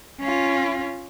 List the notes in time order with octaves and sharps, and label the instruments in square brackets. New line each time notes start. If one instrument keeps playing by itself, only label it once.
[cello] C#4 F4